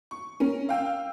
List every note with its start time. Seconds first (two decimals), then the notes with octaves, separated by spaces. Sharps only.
0.11 C#6
0.40 C#4 A#4
0.69 F5 G5 E6